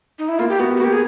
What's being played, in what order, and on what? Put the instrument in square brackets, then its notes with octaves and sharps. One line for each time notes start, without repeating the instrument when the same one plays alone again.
[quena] D#4
E4
[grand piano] A#3 [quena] F4
[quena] G4
[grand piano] B3 [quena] F#4
[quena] F#4
[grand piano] A#3
[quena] G4
G#4